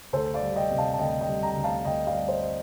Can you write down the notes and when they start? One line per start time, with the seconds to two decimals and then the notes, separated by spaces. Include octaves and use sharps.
0.13 D2 A4 C5
0.34 D5 F5
0.42 G3
0.56 D#5 G5
0.71 C3
0.78 F5 A5
0.94 A5
0.99 D2 D#5 G5
1.20 D#5 G5
1.28 G3
1.42 G5 A#5
1.57 D2
1.64 F5 A5
1.85 D2 D#5 G5
2.07 D5 F5
2.14 G3
2.28 C5 D#5